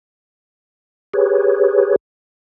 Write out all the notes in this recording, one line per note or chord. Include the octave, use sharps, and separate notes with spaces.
G4 G#4 B4 C#5